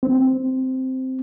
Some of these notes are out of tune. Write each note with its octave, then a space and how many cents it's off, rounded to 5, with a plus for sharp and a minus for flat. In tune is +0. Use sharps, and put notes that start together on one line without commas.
C4 -5